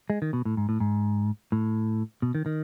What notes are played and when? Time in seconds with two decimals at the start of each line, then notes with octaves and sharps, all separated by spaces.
0.10 G#3
0.22 D#3
0.33 B2
0.45 A2
0.57 G#2
0.69 A2
0.80 G#2
1.52 A2
2.22 B2
2.35 D#3
2.46 D#3